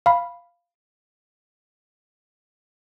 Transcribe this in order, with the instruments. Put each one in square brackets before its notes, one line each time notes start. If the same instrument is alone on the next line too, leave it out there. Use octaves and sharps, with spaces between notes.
[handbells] F5 B5